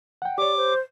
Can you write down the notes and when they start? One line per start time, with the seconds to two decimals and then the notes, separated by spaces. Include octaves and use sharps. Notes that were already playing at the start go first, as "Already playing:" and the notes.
0.22 F#5 G5
0.38 G4 C#5 D5 D6
0.57 C5